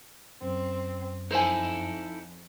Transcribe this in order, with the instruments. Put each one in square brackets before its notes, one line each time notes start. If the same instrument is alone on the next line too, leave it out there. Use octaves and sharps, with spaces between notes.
[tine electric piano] F#2 [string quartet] C4
[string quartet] F2 [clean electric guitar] D#4 E4 A4 [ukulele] C5 G#5